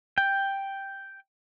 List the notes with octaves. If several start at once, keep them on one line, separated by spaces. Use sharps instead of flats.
G5